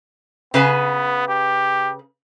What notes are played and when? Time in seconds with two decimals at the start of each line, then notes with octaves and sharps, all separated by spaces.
0.54 C#3 B3 B4 G#5
1.28 G4